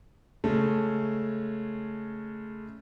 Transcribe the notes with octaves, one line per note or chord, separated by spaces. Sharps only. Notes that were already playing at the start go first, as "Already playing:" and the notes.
C#3 G#3 A3